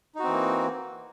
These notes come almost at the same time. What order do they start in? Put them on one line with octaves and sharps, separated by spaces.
D#4 F#4 C4 E3 A#3